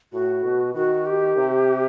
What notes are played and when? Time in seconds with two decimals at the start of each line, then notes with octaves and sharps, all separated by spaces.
0.12 A2 F#4
0.44 B2
0.75 D#3 F#4
1.06 G4
1.37 C3